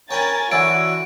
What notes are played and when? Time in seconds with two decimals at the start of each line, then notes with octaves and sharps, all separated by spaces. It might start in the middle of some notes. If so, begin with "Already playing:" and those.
0.11 A#4 C#5 G5 G#5 B5 A6
0.51 D3 E3 F#4 C#5 D7